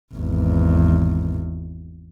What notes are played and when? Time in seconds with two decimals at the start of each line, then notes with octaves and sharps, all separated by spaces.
0.14 G#1 E2